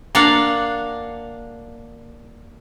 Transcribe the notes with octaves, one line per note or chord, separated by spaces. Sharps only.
A#3 D4 F5 F#5